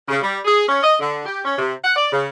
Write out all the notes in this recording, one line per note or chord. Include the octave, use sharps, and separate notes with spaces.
C#3
G3
G#4
C#4
D#5
D3
G4
C#4
C3
F#5
D5
C#3